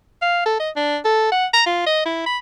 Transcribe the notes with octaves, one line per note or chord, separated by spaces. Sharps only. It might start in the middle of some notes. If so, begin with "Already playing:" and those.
F5
A4
D#5
D4
A4
F#5
A#5
F4
D#5
E4
B5